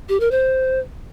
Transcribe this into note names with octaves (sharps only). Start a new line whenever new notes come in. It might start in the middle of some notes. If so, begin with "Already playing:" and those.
G4
A#4
C5